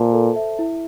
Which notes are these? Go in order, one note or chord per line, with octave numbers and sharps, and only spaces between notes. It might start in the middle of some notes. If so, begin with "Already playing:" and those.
Already playing: A#2 A4 C5 E5 A5
A4
E5
E4